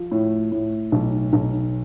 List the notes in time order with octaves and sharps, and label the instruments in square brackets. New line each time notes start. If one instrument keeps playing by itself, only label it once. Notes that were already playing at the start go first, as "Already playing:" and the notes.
Already playing: [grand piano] F3
A2
A2
B1
B1